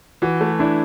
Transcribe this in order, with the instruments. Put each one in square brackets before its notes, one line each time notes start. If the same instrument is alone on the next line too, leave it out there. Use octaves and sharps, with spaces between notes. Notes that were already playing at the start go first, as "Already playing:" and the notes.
[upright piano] E3 [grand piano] F#4
[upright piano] A3
[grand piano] D4 [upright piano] E4